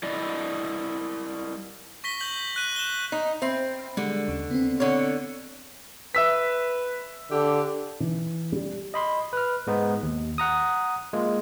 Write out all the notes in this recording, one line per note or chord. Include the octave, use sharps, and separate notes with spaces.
G3 E4 D5 D#5
C#6 A#6 B6 G7
G6 F#7 G7
F#6 D#7
E7 G7
D#4
C4 C5 E5 B5
D3 G3 G#3
D#2 C#3
B3 C4
D3 C#5
B4 E5 E6 B6
D3 G4
E3
G3
D#5 B5 C6
B4 F6
G#2 G#3 B3 D#4
D#2
F#5 A#5 D#6
G#3 A#3 F4